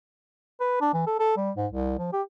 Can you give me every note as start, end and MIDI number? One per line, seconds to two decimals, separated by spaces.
0.60 0.78 71
0.81 0.91 62
0.94 1.05 52
1.07 1.15 69
1.19 1.34 69
1.37 1.51 55
1.57 1.67 44
1.72 1.96 36
1.99 2.10 53
2.13 2.22 67